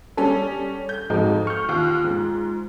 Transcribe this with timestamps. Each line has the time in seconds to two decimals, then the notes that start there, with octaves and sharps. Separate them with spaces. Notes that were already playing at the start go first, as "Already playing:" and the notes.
0.17 G3 C#4 A4
0.89 G6
1.10 F2 G#2 D#4 F#4
1.47 C#6 F6 G6
1.69 D#2 F4
2.04 G#2